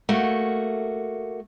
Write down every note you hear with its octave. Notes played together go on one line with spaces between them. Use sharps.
A3 A#3 F#4